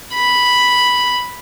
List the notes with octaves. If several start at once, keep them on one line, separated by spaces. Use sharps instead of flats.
B5